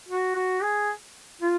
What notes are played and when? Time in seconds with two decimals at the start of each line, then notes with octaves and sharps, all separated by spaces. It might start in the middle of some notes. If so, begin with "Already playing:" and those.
0.08 F#4
0.35 F#4
0.62 G#4
1.41 F4